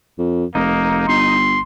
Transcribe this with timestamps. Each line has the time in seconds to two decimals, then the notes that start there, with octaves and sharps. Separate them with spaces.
0.19 F2
0.55 F1 A#3 D#4
1.08 G1 C6